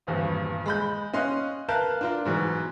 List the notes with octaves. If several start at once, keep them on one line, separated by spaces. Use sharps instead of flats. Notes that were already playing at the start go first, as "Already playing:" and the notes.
D#1 G#1 E2 G2
G#3 B5 G6
C#4 D#5 F5 C6 F#6
A#4 B4 F5 A5 F#6 G6
D4 F4 A#4
G#2 B2 E3 F#3